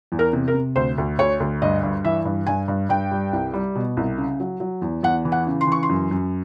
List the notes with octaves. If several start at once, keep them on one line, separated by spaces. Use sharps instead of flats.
E2
A#4
C3
A#4
C3
D2 C5
D2
D2 C#5
D2
G2 D#5
G2
E3 E5
G2
G2 G#5
G2
G2 G5
G3
C2
G3
B2
C2
C#3
F#3
F#3
E2
E2 F#5
E3
F#5
C#3
C6
E3 C#6
C6
F#2
F#2